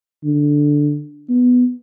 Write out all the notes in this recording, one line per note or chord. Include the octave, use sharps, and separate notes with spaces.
D3
B3